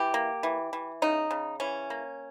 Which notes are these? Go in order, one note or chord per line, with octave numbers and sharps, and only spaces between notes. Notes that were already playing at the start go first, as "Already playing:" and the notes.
Already playing: E3 G4
A#3
E3
E3
C#3 D#4
C#3
E3 C#4
A#3